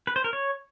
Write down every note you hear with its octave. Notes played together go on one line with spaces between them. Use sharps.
B4
C5
A#4
C#5